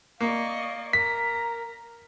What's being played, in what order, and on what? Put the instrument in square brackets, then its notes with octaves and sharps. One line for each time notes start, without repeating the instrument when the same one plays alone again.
[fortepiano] A#3 [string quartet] D5 D#5 C#6 [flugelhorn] F5
[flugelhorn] A#4 [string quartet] A#5 [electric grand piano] B6